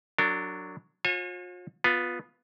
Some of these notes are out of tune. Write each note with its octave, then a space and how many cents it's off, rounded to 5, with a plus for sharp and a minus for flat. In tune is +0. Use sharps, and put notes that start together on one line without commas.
F#3 +0 D4 +0 A#4 -45
F4 +45 C#5 -40 G#5 +0
B3 +0 F4 +15